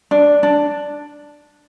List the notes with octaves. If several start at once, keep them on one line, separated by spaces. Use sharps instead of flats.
D4
D4